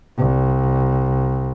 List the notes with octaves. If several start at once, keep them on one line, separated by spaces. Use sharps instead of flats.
C2